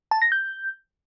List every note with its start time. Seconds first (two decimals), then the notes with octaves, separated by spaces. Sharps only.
0.11 A5
0.22 A#6
0.32 G6